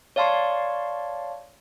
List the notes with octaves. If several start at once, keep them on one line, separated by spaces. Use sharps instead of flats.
C#5 D5 F5 A5 C6 C#6